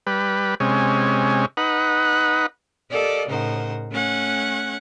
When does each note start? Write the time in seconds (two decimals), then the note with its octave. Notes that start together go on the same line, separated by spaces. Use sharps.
0.07 G3 B4
0.60 C3 G#3 C#4
1.57 D#4 B4 F#5
2.91 G4 A4 A#4 D5 D#5 F5
3.28 A2 C#3 D#4 A#4 C5 F#5
3.91 A3 C#4 F#5 F#6 G#6